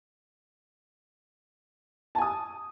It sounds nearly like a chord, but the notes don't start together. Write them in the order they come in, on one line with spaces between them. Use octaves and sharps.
A5 G#5 D#6